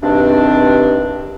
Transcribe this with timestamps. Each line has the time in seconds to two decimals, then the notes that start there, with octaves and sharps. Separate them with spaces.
0.03 E2 G2 C3 D#3 C4 D4